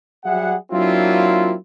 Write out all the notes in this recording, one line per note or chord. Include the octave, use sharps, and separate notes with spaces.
F#3 G3 G#4 E5 F#5
F#3 A#3 C4 D4 E4 F4